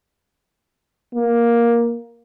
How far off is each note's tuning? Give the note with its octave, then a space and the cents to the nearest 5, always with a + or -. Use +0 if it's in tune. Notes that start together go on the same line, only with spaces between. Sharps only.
A#3 +10